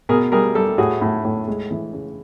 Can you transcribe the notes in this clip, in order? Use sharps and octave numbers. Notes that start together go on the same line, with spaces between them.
B2 G#4 A#4
G3 G#4 A#4
G3 G4 A4
A2 F#4 G#4
A2
A2
G#3
E3
C#3